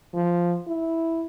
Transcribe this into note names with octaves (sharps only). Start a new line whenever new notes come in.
F3
E4